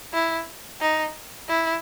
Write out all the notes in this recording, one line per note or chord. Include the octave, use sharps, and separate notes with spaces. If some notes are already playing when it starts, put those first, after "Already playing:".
E4
D#4
E4